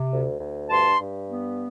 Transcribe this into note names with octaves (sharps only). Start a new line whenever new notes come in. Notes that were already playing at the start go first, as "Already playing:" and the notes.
Already playing: C3
D2
D2
G2 A5 C6
G2
B3